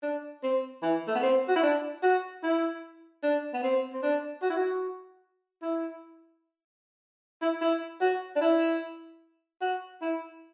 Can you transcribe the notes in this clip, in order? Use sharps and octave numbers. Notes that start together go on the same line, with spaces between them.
D4
C4
E3
A3
B3
C4
F#4
E4
D4
F#4
E4
D4
B3
C4
C4
D4
F#4
E4
F#4
E4
E4
E4
F#4
D4
E4
F#4
E4